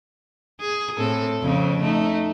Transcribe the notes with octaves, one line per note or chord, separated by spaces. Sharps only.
G#4
A2 C4 A4
F2 C#3 C4
A3 D#4